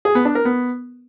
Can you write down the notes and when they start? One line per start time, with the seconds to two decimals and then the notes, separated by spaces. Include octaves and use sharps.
0.05 G#4
0.15 B3
0.25 D4
0.35 A#4
0.45 B3